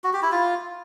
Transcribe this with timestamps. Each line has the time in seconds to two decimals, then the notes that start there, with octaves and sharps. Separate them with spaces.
0.04 F#4
0.13 G4
0.23 E4
0.32 F4